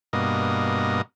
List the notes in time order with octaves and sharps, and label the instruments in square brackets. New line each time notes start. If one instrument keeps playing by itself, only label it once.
[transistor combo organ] G2 B2 A#3 D#5